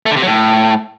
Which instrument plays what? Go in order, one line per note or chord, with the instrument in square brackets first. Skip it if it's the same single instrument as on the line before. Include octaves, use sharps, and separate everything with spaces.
[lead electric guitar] A3
D3
C3
F#3
A2